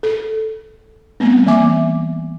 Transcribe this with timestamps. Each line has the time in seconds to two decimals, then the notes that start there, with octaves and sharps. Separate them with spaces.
0.03 A4
1.20 G3 A3 B3 C4
1.46 E3 A#3 E5 G#5 D6